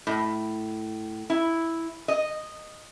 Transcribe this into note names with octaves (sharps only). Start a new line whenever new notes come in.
A2
E4
D#5